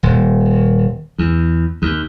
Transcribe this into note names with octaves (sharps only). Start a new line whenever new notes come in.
D#1
E2
D#2